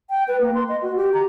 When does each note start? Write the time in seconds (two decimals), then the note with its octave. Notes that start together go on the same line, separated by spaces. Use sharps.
0.10 G5
0.28 B4
0.41 A#3
0.55 C6
0.69 D#5
0.82 F#4
0.96 G4
1.14 A#5